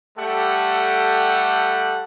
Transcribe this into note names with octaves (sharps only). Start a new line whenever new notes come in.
G3 A3 G4 A4 F#5